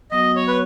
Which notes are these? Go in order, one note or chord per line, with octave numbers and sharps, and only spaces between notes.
F#3 B3 F#4 D#5
C#5
B4